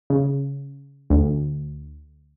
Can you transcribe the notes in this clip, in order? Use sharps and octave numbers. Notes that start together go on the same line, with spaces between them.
C#3
D2